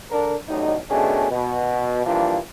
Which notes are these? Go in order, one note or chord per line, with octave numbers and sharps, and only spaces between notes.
D3 D4 A#4
A1 A2 F#3 G3 D#4
B2 D#3 A3 C#4 D4 G#4
B2
E3 F3 G3 A#3 D4 F4